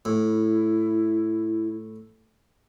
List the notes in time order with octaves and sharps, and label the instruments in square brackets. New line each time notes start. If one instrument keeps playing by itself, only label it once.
[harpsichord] A2 [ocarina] E4